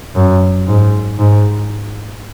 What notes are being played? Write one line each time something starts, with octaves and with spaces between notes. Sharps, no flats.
F#2
G#2
G#2